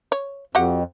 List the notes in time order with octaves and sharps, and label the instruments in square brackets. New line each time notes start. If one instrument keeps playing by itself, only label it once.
[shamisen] C#5
[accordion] F2 [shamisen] F#4 G4 F#5